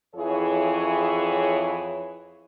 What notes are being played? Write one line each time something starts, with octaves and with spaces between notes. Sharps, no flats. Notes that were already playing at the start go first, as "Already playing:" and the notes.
F2 E3 E4 G#4 C#5